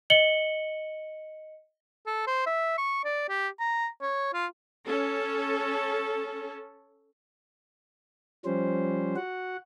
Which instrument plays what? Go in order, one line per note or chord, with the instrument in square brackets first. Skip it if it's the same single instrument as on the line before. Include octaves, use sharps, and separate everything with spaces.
[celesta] D#5 C#7 F#7 G7
[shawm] A4
C5
E5
C#6
D5
G4
A#5
C#5
F4
[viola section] C#4 A4
[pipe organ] F3 G3 C#4 C5
F#4 F#5